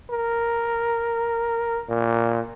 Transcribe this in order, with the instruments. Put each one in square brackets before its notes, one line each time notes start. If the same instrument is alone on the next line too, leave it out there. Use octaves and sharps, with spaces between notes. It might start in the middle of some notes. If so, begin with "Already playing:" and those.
[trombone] A#4
A#2